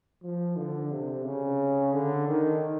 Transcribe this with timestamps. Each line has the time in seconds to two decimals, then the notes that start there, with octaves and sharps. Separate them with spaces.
0.23 F3
0.57 D3
0.92 C3
1.25 C#3
1.93 D3
2.27 D#3